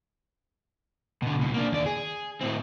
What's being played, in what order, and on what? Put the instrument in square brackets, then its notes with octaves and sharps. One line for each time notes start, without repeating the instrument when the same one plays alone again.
[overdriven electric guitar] B2 D3
C#2 B2
A#3 D4
D#2 D5
G#4
A2 C4